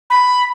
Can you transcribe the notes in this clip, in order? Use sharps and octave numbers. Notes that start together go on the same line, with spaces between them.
B5